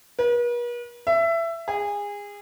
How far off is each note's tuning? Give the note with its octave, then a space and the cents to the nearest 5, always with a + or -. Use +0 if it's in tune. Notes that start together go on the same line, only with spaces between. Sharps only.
B4 -45
E5 +20
G#4 -25